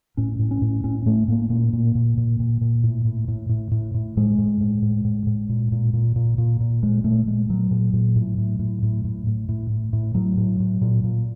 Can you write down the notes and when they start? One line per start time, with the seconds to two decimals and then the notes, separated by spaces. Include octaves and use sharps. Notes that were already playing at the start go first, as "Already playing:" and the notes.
0.17 A2 C#4
0.39 A2
0.51 C#4
0.62 A2
0.84 A2 C#4
1.06 A2 A3
1.28 A2 A#3
1.50 A#2 A#3
1.73 A#2
1.95 A#2
2.17 A#2
2.40 A#2
2.61 A#2
2.83 A2
3.05 A2
3.28 A2
3.49 A2
3.71 A2
3.94 A2
4.17 A2 G#3
4.38 A2
4.61 A2
4.82 A2
5.05 A2
5.27 A2
5.49 A#2
5.72 A#2
5.94 A#2
6.16 A#2
6.38 A#2
6.60 A#2
6.83 A#2 G#3
7.04 A#2 A3
7.27 A#2 G#3
7.49 A#2 F#3
7.71 A#2
7.93 A#2
8.16 A2
8.38 A2
8.59 A2
8.83 A2
9.05 A2
9.27 A2
9.49 A2
9.70 A2
9.93 A2
10.15 A2 F#3
10.37 A2
10.60 A2
10.81 A#2
11.04 A#2